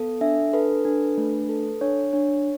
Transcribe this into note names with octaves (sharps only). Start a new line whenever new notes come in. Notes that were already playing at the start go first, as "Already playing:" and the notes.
Already playing: B3 A4
D4 E5
A4 B4
D4
A3
A4
D4 C#5
D4 C#5